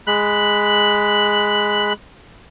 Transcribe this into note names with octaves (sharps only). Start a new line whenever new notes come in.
G#3 B5 F#6